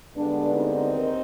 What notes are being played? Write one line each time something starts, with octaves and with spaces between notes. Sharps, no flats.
G2 D3 G#3 B3 D4
C4 D#4
D#2 D#3